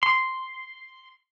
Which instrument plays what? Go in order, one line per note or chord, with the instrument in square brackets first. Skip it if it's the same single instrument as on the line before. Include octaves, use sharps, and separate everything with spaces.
[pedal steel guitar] C6